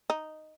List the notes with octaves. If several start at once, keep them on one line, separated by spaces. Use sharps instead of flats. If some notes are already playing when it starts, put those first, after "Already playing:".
D#4